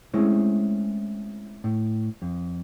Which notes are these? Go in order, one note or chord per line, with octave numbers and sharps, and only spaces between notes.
G#3 A3 C4 C#4 E4 C#5
A2
F2